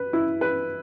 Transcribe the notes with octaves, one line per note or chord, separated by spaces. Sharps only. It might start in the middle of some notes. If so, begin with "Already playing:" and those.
Already playing: B4
E4
B4